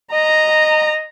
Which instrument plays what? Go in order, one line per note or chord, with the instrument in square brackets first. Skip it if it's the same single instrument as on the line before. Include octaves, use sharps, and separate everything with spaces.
[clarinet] D#5 [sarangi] A#5